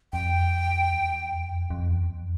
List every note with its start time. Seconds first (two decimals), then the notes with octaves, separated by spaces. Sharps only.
0.13 F2 G5
0.92 E2
1.32 F2
1.70 F2
1.91 E2
2.10 F2